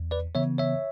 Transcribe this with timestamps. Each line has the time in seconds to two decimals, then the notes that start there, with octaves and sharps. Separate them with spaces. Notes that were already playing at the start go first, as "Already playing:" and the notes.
Already playing: E2
0.11 B4 D5
0.35 C#3 E3 B3 C#5 E5
0.58 C#5 E5